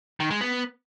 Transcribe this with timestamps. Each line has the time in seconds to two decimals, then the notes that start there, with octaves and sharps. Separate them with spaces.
0.20 D#3
0.30 G#3
0.41 B3